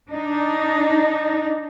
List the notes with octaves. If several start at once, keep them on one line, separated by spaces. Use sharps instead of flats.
D4 D#4